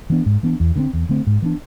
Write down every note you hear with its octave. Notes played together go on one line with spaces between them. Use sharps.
E3 B3 D4
G#2
E3 B3 D4
E2
D3 A3 C4
E2
D3 A3 C4
G#2
E3 B3 D4